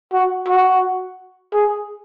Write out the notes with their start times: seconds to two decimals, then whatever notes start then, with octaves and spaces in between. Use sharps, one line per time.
0.13 F#4
0.48 F#4
1.53 G#4